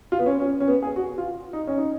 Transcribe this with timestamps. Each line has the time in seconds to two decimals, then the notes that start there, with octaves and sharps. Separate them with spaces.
0.12 F4
0.19 B3
0.26 C#4
0.40 C#4
0.60 C#4
0.68 B3
0.82 G#4
0.96 F#4
1.18 F4
1.53 D#4
1.67 C#4
1.78 D#4